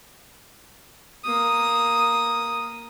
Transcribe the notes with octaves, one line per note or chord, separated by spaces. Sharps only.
A#3 D#6